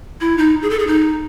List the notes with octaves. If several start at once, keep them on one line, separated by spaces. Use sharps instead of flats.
E4
D#4
G#4
A4
G#4
D#4